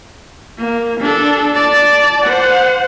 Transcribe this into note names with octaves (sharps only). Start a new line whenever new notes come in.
A#3
D4 A4
D5 A5
C5 F#5